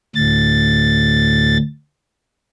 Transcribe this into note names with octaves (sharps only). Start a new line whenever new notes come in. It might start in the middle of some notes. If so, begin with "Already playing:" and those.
D2 A2 A6